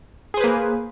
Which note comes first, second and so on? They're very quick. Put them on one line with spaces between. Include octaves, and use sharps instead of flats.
G#4 C5 B4 A#3